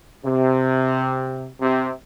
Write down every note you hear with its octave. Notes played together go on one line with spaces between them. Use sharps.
C3
C3